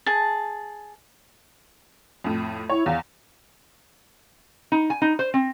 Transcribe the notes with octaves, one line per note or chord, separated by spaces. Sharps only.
G#4 A5
F2 A2
E4 C#5
E2 F5
D#4
G#5
D#4
C5
C4